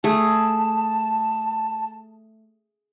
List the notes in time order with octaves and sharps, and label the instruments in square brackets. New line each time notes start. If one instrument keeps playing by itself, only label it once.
[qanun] A3 G#4 [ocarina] A5